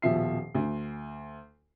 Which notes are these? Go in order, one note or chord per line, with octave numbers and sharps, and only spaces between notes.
D#1 B2 F3 E5 C7
D2